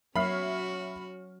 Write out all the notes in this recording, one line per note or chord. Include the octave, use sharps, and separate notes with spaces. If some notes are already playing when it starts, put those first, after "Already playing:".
F#3 C#4 F#4 C#5 E5 B5 F6 C7